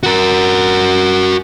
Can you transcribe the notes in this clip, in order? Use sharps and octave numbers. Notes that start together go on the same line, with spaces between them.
F#4 A#4